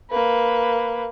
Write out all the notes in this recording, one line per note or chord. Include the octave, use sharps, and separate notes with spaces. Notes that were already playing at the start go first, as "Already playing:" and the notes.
A#3 B4